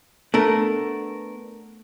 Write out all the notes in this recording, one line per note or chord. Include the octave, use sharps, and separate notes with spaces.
A3 B3 D4 A#4